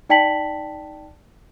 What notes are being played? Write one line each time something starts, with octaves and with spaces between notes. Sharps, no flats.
D#4 D5 G5 A5 B6 F#7